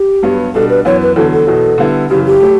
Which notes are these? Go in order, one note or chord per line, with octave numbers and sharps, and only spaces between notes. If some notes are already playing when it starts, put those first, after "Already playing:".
Already playing: G4
G2 F#3 B3
B2 G3 D4 A4
B4
F#2 E3 B3 C#5
B4
E2 D3 F#3 B3 A4
A4
E2 B2 F#3
D3 G3 B3 E4
F#2 C#3 E3 G4
G4
F#3 A3